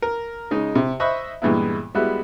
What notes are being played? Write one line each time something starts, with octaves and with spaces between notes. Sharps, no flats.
A#4
C#3 G#3 D#4
C3
C5 D#5 E5 B5 C#6 F#6
G2 A#2 E3 G#3 B3 E4
G3 G#3 B3 E4 F#4